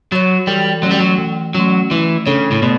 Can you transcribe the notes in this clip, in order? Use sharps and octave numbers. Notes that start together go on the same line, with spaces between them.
F#3 F#4 C#5
E3 G3
F#3 A3 C#4
G3
F#3
E3
F#3 A3 C#4
E3 A3
C#3 D4 A4 C#5
A2
B2 A3